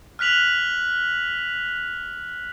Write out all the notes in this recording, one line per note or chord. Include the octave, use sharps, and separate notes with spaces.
F6 F#6 B6 F7 F#7